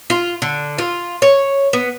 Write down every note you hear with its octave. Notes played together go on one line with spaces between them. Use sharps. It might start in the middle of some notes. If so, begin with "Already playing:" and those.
F4
D3
F4
C#5
B3